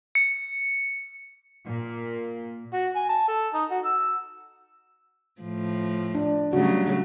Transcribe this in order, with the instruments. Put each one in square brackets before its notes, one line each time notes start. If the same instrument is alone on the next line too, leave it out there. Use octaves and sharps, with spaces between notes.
[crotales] C#7
[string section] A#2
[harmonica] F#4
G#5
A5
A4
D#4
F#4
E6
[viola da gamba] A2 F3
[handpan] D4
[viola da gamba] C#3 F#3 A3 [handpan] G3 F#4